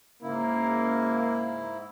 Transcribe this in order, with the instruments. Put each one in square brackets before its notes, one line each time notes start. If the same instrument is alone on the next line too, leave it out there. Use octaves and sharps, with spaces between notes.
[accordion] G#2 E4 [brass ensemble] C#3 A#3